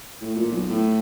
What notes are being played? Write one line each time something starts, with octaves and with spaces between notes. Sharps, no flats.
A2
A#2
B1
A2